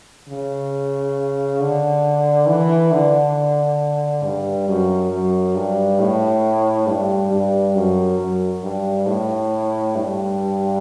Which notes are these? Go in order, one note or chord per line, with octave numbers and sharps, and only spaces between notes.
C#3
D3
E3
D3
G2
F#2
F#2
G2
A2
G2
G2
F#2
F#2
G2
A2
G2